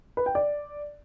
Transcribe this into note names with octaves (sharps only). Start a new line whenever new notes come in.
B4
G5
D5